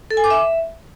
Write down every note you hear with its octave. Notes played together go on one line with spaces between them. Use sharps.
A4
G#5
D6
E5